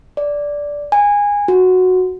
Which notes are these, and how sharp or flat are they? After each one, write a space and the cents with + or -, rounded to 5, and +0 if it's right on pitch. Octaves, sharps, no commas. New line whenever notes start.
D5 -10
G#5 -20
F#4 -5